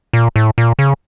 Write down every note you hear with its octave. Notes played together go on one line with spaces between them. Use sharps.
A#2
A2
A#2
C#3